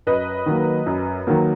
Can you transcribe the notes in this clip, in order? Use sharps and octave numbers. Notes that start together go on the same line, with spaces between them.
F#2 B4 D#5
D#3 F#3 A#3
F#2
D#3 F#3 A#3